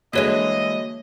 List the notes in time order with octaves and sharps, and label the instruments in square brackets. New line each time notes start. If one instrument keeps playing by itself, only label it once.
[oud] D3 E3 G#3 [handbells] A#3 F#4 C#5 [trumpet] D#5